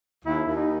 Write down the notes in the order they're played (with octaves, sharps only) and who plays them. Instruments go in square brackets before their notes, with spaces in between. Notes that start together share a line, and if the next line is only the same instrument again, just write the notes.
[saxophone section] D#2 [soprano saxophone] E4
[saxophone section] D#2
[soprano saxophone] D#4